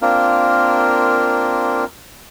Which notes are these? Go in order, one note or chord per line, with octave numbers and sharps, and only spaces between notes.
A#3 C4 D4 F4 A#4